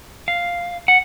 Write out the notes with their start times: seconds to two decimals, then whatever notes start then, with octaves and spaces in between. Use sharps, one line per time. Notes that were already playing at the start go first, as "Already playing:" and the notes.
0.28 F5
0.88 F#5